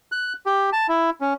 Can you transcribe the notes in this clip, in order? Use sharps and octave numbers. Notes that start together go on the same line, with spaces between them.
F#6
G4
A5
E4
C#4